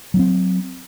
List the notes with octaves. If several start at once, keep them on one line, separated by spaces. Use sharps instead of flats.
F#3 C4 C#4